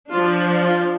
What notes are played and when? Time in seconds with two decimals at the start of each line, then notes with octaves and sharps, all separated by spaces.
0.11 D4 F4
0.16 F3
0.65 F4